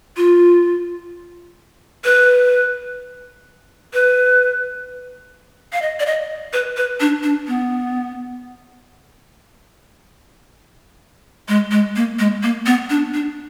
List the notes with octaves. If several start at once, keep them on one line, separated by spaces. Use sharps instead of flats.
F4
B4
B4
F5
D#5
D5
D#5
B4
B4
D4
D4
B3
G#3
G#3
A#3
G#3
A#3
B3
D4
D4